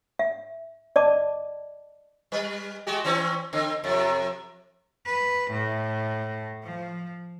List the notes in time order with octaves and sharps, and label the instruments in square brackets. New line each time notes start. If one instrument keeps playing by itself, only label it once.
[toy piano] E5
D5 D#5 A5 D6
[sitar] G3 B4
G#3 F#4 G4
E3 C4 C#4
D3 C4
F2 C3
[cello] B4
A2
F3